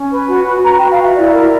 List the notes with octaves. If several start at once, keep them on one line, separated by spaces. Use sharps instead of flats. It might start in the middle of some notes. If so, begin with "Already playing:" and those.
Already playing: C#4
B4
F#4
F#4
B4 A#5
G5
F#4
F5
F#4
E5
E4 D5
A#4